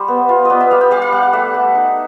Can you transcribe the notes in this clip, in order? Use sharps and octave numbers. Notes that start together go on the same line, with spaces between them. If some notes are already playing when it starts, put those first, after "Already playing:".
Already playing: G3 C5
B3
F4
B3 D5 D#5
E5
G3 F5
G5
G3 F5
F5
G3 F#5
F#5
A3 E5
A3
D#4